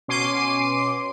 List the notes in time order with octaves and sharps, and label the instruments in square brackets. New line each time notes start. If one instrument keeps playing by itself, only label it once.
[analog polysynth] B2 C#4 C6 D6 C7 D#7